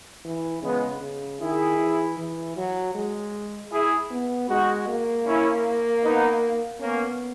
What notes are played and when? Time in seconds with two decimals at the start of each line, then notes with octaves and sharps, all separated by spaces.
0.25 E3
0.63 C#3 G#3 B3
1.02 C#3
1.41 D#3 E4 G#4
1.79 E3
2.18 E3
2.57 F#3
2.95 G#3
3.72 E4 G#4
4.10 B3
4.49 G#3 D#4 F#4
4.88 A#3
5.27 C#4 E4
6.03 B3 D#4
6.81 A#3 B3 C#4